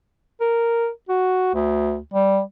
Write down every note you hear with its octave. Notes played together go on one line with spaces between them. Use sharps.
A#4
F#4
D2
G3